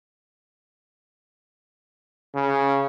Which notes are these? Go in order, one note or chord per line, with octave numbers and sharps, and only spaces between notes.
C#3